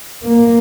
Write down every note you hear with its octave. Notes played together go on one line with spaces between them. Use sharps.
A#3